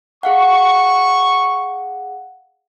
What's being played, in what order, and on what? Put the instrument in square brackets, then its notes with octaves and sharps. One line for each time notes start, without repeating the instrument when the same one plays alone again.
[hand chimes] G#4 F5 F#5 [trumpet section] C#6